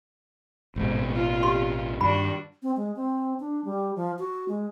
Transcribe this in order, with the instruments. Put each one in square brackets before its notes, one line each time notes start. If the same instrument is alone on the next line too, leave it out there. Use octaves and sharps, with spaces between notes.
[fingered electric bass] A1 B2 [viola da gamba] G#2
[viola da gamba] F4
[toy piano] G4 C6
[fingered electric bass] G2 [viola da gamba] D#3 D4 F#4 [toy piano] B5
[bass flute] C4
G#3
C4
D4
G3
F3
F#4
G#3